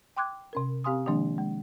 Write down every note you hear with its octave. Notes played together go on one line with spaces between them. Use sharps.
G5 C6 D6 F#6 G#6
C3 C#4 A#4
C4 G4 F5 G#5 C6 D#6
D#3 F3 G#3 A#3 D4
G#3